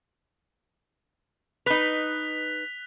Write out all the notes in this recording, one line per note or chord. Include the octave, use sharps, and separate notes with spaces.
D#4 B4 F#6 B6 F7